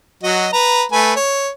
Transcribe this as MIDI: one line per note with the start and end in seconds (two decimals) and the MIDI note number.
0.23 0.48 54
0.23 0.48 66
0.23 0.48 75
0.53 0.83 71
0.53 0.83 82
0.92 1.13 57
0.92 1.13 71
0.92 1.13 80
1.16 1.50 73